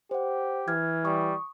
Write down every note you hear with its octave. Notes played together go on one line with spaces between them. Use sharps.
G4 C5 F#5
E3 F6 G#6
G3 C#6 D#6